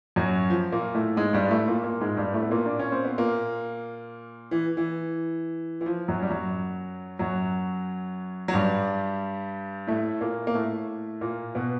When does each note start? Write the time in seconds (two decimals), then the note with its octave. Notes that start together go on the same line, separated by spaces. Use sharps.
0.16 F#2 F#3
0.50 F3
0.72 A#2 A#3
0.94 A2 A3
1.16 G#2 G#3
1.33 G2 G3
1.50 A2 A3
1.68 A#2 A#3
1.84 A#2 A#3
2.01 G#2 G#3
2.17 G2 G3
2.34 A2 A3
2.43 B3
2.51 A#2 A#3
2.66 D4
2.79 C#4
2.92 C4
3.04 B3
3.18 A#2 A#3
4.51 E3
4.77 E3
5.81 E3
5.86 F3
6.08 F#2 F#3
6.22 G3
6.30 F#2 F#3
7.19 F#2 F#3
8.48 F#3
8.53 G2 G3
9.87 A2 A3
10.21 A#2 A#3
10.47 A#3
10.55 A2 A3
11.21 A#2 A#3
11.55 B2 B3